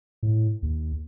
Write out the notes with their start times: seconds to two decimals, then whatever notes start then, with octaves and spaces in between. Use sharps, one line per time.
0.23 A2
0.63 D#2